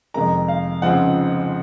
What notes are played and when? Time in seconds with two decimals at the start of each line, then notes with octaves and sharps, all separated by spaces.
0.14 F2 C3 D#3 G#3 A#5
0.48 F5
0.82 C#2 C#3 F3 C4 D#4 F#5